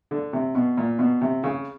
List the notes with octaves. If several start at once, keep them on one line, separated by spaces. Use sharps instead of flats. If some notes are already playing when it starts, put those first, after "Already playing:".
D3
C3
B2
A#2
B2
C3
C#3